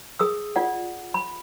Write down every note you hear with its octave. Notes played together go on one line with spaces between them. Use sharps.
G#4 D#6 E6
F4 D5 F#5
B5